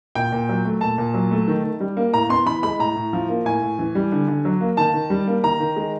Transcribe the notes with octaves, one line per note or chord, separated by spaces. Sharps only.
A#2 G5
A#2
F#3
A3
A#2 A5
A#2
F#3
A3
D#3
D#3
G3
A#3
A2 A#5
B3 C6
E3 B5
G#3 B5
A2 A#5
A2
F3
A#3
A2 G#5
A2
E3
G3
D3
D3
F#3
A#3
D#3 A5
D#3
G3
A#3
D#3 A#5
D#3
G#3